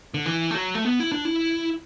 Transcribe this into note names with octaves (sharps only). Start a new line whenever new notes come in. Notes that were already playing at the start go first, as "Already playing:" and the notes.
D3
E3
A3
F#3
A3
B3
E4
D4
E4